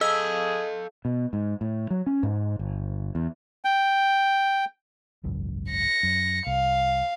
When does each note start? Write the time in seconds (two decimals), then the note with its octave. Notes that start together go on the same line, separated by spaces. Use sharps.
0.01 G#4 A4 D#5 F5 E6
1.05 B2
1.33 G#2
1.61 A2
1.90 F#3
2.06 C#4
2.23 G#2
2.59 G1
3.15 E2
3.65 G5
5.24 G#1 C#2 F#2
5.70 A#6 C#7
6.03 F#2
6.46 C2 F5